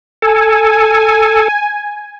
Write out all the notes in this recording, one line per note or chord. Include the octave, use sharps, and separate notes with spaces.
A4 G#5